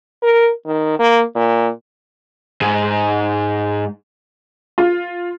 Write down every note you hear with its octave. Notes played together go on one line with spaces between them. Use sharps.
A#4
D#3
A#3
A#2
G#2
F4